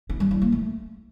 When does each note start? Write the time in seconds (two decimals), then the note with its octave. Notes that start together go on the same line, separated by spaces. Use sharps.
0.10 E4
0.20 G3
0.31 E4
0.42 A#3
0.52 A3